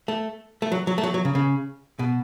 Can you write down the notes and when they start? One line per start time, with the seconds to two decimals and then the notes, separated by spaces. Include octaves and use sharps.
0.08 A3
0.62 A3
0.72 F#3
0.87 F#3
0.98 A3
1.03 F#3
1.14 F#3
1.25 C#3
1.35 C#3
1.99 B2